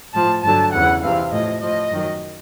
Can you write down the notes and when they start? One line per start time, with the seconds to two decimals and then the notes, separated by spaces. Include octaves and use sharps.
0.14 A2 F3 A5
0.43 G2 D3 F#3 A5
0.73 E2 C#3 E3 F#5
1.02 E2 C3 E3 F5
1.31 A2 F3 D#5
1.62 A2 F3 D#5
1.91 F#2 D#3 F#3